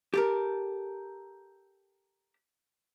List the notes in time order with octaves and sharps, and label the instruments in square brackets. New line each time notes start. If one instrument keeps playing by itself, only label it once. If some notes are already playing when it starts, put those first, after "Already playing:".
[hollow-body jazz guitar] G4 A4 A#4